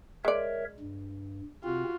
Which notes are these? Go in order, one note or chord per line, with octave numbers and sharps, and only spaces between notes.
G#3 A#4 C#5 D5 E5
G2
C3 C4 F4 F#4